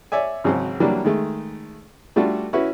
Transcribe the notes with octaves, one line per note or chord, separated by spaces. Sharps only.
C#5 D5 E5 G#5
G#1 C#3 F#3 C4 C5
E3 F#3 G3 A#3 D4
D#3 G#3 A3
G3 A3 D4 F4 F#4 A4
C#4 E4 F#4 B4